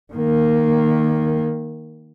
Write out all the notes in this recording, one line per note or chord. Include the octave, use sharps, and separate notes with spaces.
D#3 A#3